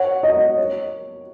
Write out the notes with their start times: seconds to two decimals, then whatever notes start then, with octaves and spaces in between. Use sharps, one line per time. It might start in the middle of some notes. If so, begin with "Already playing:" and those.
Already playing: C#5 F#5
0.23 D#5
0.58 C#5